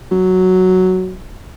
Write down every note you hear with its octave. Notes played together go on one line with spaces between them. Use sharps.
F#3